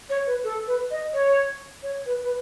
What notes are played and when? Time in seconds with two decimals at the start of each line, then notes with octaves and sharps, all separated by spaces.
0.10 C#5
0.27 B4
0.44 A4
0.67 B4
0.91 D#5
1.14 C#5
1.83 C#5
2.06 B4
2.23 B4